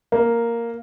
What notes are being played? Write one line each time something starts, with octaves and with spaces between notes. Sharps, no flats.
A#3